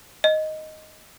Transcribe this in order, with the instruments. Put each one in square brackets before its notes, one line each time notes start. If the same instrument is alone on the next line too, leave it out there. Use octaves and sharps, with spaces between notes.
[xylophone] D#5